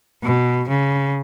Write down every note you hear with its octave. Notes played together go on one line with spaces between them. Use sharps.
B2
C#3